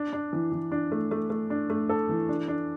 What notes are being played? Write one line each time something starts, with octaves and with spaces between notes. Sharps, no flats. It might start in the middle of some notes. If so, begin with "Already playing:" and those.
Already playing: D4
D4
E3
E3
D4
A3
A3
A3
D4
A3
A4
E3
D4
D4